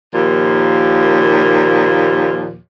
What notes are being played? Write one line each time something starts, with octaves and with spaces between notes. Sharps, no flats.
D#2 A#2 F3